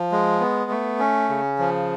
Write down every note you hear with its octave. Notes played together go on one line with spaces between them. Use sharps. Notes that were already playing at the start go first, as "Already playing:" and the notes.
Already playing: F3
G#3
B3
A3
C#4
C#3
F3